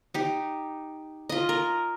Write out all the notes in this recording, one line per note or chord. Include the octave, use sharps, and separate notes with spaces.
D#4 G4
F4 D#5
A#4